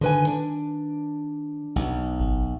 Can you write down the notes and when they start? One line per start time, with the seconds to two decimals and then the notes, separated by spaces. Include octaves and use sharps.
0.01 D3 D#3 B4 G#5
0.27 D4
1.76 B1
2.20 G#1